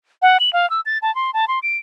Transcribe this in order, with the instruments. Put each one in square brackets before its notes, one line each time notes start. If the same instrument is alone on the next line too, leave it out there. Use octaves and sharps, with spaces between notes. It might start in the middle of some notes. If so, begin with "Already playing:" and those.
[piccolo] F#5
F#7
F5
E6
A6
A5
C6
A5
C6
D7